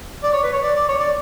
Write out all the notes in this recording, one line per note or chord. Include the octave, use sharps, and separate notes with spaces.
D5
C#5
B4
C#5
D5
D5
C#5
D5